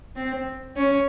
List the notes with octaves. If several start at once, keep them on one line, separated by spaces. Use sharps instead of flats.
C4
C#4